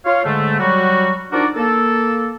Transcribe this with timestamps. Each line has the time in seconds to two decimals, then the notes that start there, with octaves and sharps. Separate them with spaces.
0.05 F4 C#5 F5
0.24 G#2 D3 G#3 A3
0.59 F#3 G3 F#4
1.31 F3 D4 D#4 F#4 A#4 D5
1.56 A#3 A4